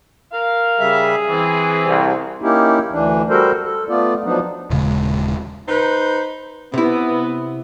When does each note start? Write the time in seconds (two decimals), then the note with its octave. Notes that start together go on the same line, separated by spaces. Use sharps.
0.32 A#4 F5
0.80 C#3 G3 G#4 E5
1.29 E3 C4
1.86 C2
2.42 A#3 C#4 D#4 E4 G4
2.92 D2 E3 D4
3.29 G3 F#4 A4 A#4 C5
3.63 A4
3.89 A3 B3 F4 D5
4.24 F3 F#3 B3 D4 D#4
4.70 D#1 C#3 G#3
5.68 D#4 B4 C5
6.74 C3 B3 E4